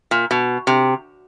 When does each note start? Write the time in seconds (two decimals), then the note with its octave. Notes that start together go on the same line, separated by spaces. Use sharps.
0.11 A#2
0.31 B2
0.67 C3